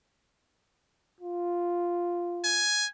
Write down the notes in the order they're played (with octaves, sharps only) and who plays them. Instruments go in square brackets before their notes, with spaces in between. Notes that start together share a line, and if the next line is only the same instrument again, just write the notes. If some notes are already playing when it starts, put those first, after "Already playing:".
[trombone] F4
[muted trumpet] G#5